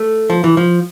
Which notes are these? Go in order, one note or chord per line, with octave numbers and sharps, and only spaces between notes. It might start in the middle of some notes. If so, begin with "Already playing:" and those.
Already playing: A3
F3
E3
F3